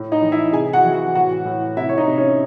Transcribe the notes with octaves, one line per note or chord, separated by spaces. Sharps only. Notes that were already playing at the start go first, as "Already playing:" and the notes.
Already playing: A2
D#4 D#5
E3
E4 E5
C3 G#4 G#5
F#4 F#5
E3
F#4 F#5
A2 F#4 F#5
A2
C3 E4 E5
C#5
D#4 D#5
C3
C#4 C#5